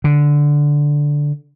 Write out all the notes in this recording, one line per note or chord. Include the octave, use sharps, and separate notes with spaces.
D3